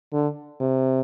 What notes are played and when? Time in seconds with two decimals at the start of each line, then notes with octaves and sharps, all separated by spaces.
0.13 D3
0.61 C3